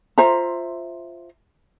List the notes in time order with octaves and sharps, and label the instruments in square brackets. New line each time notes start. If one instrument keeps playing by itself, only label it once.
[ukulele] F4 C5 E5 A#5